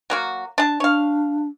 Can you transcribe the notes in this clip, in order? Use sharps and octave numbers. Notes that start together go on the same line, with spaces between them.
F#3 A#3 F#4
D4 A5
D4 C#5 F5